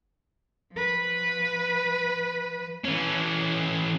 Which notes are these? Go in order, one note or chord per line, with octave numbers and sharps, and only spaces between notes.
F3 B4
E3 C#4